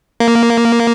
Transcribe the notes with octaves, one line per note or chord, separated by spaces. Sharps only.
A#3